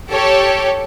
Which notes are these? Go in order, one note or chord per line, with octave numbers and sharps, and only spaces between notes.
G4 A4 C#5